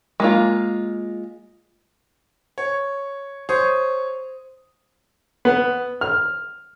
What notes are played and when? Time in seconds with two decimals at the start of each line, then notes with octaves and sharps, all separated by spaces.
0.20 G#3 A#3 F4
2.58 C#5
3.49 C5 C#5 D#6
5.45 B3
6.01 F6